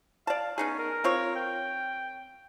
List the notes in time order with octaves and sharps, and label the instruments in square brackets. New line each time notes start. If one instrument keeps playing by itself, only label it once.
[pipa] D5 A5 [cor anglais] F5
[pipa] B3 D#4 G#4 [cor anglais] C#4
[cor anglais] A#4
[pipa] C4 F4 C#5
[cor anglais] G5